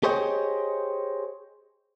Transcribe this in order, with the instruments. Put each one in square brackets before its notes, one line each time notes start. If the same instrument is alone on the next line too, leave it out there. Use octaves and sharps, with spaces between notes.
[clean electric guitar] G4 G#4 C5 C#5 D#5 G5